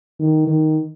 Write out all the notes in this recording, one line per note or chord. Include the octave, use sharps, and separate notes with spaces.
D#3
D#3